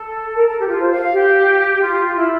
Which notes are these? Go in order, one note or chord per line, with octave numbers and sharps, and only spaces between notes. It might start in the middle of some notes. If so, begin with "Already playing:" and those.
Already playing: A4
A#4
A4
G4
F4
C5
F5
F5
G4
F4
F4
E4